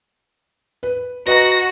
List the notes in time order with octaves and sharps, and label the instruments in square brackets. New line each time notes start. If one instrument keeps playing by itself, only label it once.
[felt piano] B4
[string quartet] F#4 [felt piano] B4 D#5 A#5 [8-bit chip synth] A#6